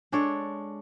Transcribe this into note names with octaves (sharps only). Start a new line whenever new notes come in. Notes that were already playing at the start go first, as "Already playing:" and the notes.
G#3 D4 A4 C#5